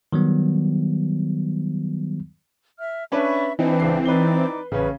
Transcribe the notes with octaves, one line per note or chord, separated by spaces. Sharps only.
D#3 F#3 G3 B3
E5 F6
C#4 D4 B4 E5 B5 C#6
E3 C4 D4 D#4 B4
C#2 C7
D#4 B4 D5 D6 G7
A1 C#3 C#4 B4